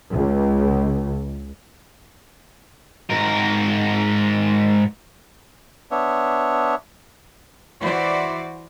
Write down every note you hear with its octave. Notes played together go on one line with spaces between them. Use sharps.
C#2
G#2 A#4
B3 D4 C#5 E5
E3 E4 F#4 C5 D5